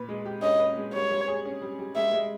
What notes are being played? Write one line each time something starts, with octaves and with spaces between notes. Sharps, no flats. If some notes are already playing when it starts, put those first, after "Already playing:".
Already playing: A#2 B4
G#3
G4
C#4 D#5
B4
G#3
G3 C#5
G3
G#4
C#4
G3
G3
G#3 E5
G#3